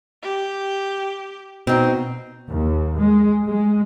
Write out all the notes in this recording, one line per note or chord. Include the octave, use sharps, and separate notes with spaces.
G4
B2 C4 D#4
D#2
G#3
G#3